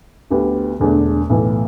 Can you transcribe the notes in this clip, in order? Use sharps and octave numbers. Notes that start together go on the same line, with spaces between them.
D2 D3 B3 G4
E1 E2 D3 A3 D4
B1 A2 E3